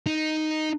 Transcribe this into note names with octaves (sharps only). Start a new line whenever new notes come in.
D#4